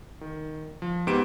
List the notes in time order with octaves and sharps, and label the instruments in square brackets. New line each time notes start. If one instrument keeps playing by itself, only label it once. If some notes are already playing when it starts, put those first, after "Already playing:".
[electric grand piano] D#3
F3
G#2 B3 G4 D7 E7